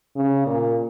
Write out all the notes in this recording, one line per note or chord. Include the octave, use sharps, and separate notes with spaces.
C#3
A#2